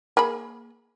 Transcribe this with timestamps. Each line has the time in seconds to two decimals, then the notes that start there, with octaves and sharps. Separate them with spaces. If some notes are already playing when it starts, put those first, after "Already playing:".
0.17 A#3 G#4 B5